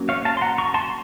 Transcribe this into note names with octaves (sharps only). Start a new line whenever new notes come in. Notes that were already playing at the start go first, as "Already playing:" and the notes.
Already playing: F#3 A#3 C#4
C#5 F5
F5 A5
C6
F#5 A#5
A#5 C#6
A5 C6